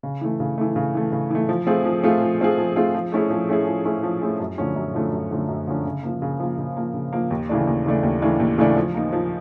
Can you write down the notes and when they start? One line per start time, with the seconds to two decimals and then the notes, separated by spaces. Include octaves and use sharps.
0.03 C#3
0.21 E3 A3
0.40 C#3
0.58 E3 A3
0.76 C#3
0.95 E3 A3
1.12 C#3
1.30 E3 A3
1.49 F3
1.67 A3 C4 F4 G#4
1.85 F3
2.03 A3 C4 F4 G#4
2.21 F3
2.40 A3 C4 F4 G#4
2.58 F3
2.76 A3 C4 F4 G#4
2.95 F3
3.12 A3 C#4 E4 G#4
3.30 F3
3.49 A3 C#4 E4 G#4
3.67 F3
3.85 A3 C#4 E4 G#4
4.03 F3
4.22 A3 C#4 E4 G#4
4.40 F#2
4.58 D3 F3 A3 C#4
4.76 F#2
4.94 D3 F3 A3 C#4
5.13 F#2
5.31 D3 F3 A3 C#4
5.49 F#2
5.67 D3 F3 A3 C#4
5.85 C#3
6.03 F3 A#3
6.22 C#3
6.40 F3 A#3
6.58 C#3
6.77 F3 A#3
6.94 C#3
7.13 F3 A#3
7.31 D#2
7.49 C#3 E3 A3 D4
7.67 D#2
7.86 C#3 E3 A3 D4
8.03 D#2
8.22 C#3 E3 A3 D4
8.40 D#2
8.58 C#3 E3 A3 D4
8.76 F3
8.94 A#3 D#4
9.13 F3